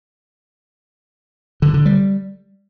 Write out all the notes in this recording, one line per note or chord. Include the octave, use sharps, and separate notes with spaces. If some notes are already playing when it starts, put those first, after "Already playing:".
D3
D3
G3